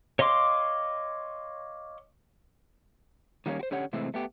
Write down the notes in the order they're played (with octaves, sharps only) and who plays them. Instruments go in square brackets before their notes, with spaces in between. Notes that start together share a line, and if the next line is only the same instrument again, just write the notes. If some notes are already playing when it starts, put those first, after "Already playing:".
[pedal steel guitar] C#5 D#5 F5 C6 D6
[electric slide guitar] D#3 G3 A#3 B3 C#4
F#4 C5
D3 C#4 G4 C#5 F#5
A2 C3 E3 G#3 A3 C4
A3 B3 G4